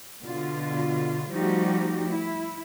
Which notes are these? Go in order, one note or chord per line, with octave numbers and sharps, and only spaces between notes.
B2 D3 F4
F3 G3 A3 D#4 F#4 G4
E4